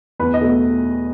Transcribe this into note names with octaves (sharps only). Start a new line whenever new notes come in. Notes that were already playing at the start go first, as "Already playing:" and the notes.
E2 B4
D#5
B2 A3